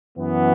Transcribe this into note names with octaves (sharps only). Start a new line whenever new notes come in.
F#2 E3 B3